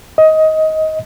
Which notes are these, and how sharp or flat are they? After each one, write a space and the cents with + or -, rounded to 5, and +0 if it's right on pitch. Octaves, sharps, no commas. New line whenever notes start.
D#5 +15